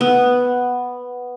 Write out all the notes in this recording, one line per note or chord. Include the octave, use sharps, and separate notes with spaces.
B3